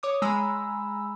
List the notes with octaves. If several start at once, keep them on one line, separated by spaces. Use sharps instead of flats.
C#5 D6 D#6
G#3 G#5 A#5 B5 E6